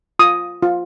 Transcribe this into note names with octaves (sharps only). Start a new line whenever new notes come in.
F4 D#6
F4